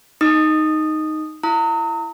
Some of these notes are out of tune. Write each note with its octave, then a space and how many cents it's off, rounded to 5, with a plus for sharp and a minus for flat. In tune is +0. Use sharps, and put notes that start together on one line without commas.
D#4 +0 D#6 -10
E4 +25 A#5 -35 D#6 +40